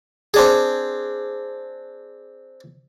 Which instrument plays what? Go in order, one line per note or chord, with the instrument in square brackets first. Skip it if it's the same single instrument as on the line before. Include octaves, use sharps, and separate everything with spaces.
[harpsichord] C4 D4 G#4